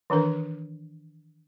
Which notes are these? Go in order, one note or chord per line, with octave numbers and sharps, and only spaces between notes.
D#3 E3 D4 A#4 B4